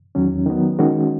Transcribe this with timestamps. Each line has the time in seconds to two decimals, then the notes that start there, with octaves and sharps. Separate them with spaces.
0.15 E2 D#3 F#3 C#4
0.46 D#3 F#3 B3
0.79 D#3 G#3 C#4 F#4